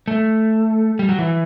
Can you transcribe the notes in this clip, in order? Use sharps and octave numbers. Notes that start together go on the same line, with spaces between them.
A3
G3
F#3
E3